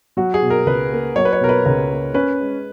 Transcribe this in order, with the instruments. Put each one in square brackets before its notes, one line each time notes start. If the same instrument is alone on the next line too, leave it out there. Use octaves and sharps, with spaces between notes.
[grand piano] F#3 [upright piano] F#4
[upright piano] G#4
[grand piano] B2
[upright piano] A#4
[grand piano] C#2 [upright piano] B4
[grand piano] A#3
[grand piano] F#3 [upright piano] C#5
[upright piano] B4
C#5
[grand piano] B2 [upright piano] A#4
[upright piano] B4
[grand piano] C#2 [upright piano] A#4
[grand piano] A#3
[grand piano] C#4 [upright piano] B4
[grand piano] G#3